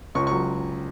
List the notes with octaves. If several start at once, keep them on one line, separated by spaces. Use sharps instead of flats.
C#2 C#6
C#6
F#3